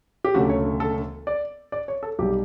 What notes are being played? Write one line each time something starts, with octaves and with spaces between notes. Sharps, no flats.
G4
E1 D2 C#3 F#3 A3 F#4
C#5
A4
D5
D5
C#5
A4
B1 B2 G3 G4